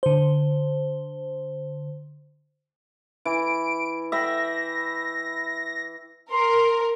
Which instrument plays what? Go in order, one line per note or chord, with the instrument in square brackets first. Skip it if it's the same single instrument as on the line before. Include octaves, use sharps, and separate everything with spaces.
[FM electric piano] D3 C5
[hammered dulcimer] E3 [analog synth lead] D7
[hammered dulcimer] E5 G5 B5 [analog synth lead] A#6
[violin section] A#4 [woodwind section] C6